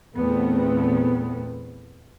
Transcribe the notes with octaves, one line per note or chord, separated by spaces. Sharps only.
E2 A#2 A3 B3 C4